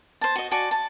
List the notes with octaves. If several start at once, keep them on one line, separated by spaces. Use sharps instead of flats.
C5 A5
F#4 D#5
F#4 D5 G#5 A5
A5